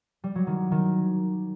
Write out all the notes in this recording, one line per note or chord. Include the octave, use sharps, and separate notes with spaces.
G3
F#3
D#3
D#3